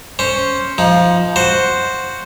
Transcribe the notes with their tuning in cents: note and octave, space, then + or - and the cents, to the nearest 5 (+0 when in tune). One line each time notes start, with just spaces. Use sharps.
C#4 +0 C5 +0
F3 +0 D#4 +20
F#4 +0 C5 +0